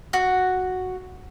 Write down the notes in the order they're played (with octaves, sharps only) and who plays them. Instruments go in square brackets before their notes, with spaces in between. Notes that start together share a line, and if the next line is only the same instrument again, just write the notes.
[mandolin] F#4